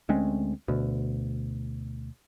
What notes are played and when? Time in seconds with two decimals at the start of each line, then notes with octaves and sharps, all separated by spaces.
0.09 D2 G#3 C4 C#4
0.68 D2 B2